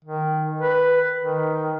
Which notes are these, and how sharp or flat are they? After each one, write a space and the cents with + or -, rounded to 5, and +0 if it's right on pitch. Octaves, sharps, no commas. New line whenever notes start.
D#3 +0
B4 +5
D#3 +5